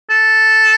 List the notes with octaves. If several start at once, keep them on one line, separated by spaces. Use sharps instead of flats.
A4